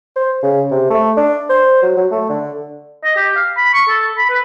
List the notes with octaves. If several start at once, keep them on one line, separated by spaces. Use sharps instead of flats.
C5
C#3
C3
A3
D4
C5
F#3
F#3
A3
D3
D#5
G4
F5
B5
C#6
A4
B5
B4